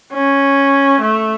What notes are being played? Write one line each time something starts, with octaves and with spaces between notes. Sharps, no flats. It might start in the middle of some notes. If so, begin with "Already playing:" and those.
C#4
A3